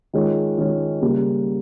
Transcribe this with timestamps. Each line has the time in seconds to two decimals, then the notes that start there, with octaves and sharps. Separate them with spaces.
0.13 D#3 G#3 C#4 F4
0.58 D#3 G#3 C#4 F4
1.02 C#3 G3 A#3